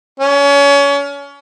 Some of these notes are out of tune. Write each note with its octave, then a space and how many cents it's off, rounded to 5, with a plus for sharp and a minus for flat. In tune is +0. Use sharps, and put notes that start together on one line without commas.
C#4 +30